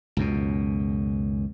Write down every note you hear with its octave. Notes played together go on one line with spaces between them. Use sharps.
C#2 F#2 B2